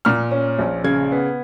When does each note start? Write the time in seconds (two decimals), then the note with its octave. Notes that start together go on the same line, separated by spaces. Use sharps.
0.05 A#2 F6
0.31 C#4
0.59 A#1
0.84 C#3 G#6
1.12 B3